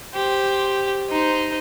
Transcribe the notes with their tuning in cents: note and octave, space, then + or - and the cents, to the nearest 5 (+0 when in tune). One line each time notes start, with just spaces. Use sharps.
G4 +0 C5 +0
D#4 +0 C5 -15